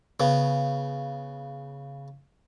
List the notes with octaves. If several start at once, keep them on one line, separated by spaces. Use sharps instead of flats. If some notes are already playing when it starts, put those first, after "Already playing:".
C#3 B3